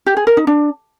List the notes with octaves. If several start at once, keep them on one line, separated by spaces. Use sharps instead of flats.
G4
G#4
A#4
D#4
D4